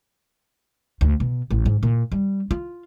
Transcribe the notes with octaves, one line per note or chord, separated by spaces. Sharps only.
D2
B2
A1
G#2
A#2
G3
F4